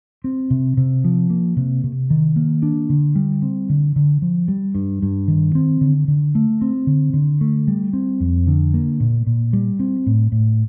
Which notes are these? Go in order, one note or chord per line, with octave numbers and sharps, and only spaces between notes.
C4
C3
C3
F3
A#3
C3
C3
D#3
A#3
D4
D3
G3
C4
D3
D3
F3
G3
G2
G2
D#3
C4
D3
D3
A3
C4
D3
D3
A3
G3
C4
F2
D3
A#3
A#2
A#2
G3
C4
A2
A2